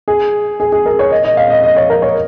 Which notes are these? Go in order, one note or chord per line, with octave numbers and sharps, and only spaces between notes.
G#4
G#4
G#4
A#4
C#5
D#5
D#5
F5
D#5
D#5
C#5
A#4
C#5